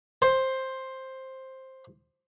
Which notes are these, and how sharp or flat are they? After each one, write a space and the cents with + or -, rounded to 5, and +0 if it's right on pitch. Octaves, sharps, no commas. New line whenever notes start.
C5 +10